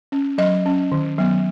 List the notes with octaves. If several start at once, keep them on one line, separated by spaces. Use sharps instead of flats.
C#4
F#3 D#5
C#4
D#3
F#3 B3